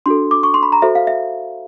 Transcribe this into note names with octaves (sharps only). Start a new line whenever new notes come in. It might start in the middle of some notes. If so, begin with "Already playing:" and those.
D4 F#4 A4 C6
D6
C#6
C6
B5
A#5
F#4 A4 C5 E5
F5
E5